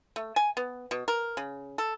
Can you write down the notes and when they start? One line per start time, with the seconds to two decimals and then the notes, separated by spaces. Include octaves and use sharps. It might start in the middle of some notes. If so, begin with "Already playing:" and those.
0.16 A3
0.36 G#5
0.57 B3
0.91 B2
1.08 A#4
1.37 C#3
1.78 A4